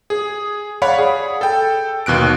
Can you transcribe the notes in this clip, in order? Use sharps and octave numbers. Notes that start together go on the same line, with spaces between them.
G#4
C#5 D5 F5 F#5 B5
G#4
A4 G5
D#2 B2 F#6 D7